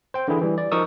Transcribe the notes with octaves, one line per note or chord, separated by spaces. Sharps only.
C5 G5
D3 E3 E4 G#4
E3 G3
D5
F3 D#4 A#4 C#6 D#6 E6